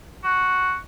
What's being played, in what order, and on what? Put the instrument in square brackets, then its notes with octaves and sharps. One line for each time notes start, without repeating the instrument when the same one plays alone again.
[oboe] F#4